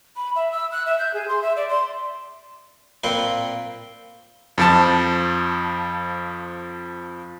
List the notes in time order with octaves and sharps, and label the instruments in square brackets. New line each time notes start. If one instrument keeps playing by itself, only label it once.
[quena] B5
E5
E6
F#6
E5
G6
G#4
C6
E5
D5
C6
[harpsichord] A#2 C4 B4 C6
[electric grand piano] F2 F3 A5